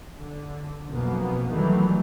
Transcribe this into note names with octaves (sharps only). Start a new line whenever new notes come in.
D3
B1 F2 B2 A#3 B3
D#3 E3 F#3 G3 A3